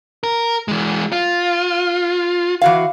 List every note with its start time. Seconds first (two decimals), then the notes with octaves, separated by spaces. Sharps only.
0.23 A#4
0.68 E3 G#3
1.12 F4
2.61 E3 F#4 F5